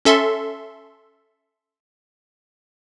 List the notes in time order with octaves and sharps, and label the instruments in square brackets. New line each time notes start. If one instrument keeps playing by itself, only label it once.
[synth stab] C#4 A4 E5 C6